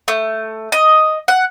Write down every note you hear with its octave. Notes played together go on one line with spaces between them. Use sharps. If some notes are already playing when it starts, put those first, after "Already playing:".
A3
D#5
F#5